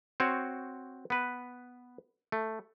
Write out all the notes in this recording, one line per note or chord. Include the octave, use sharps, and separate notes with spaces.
C4 F#4 C5 C#5
B3 B4
A3